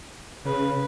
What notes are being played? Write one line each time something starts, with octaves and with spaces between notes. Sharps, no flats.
C#3 B4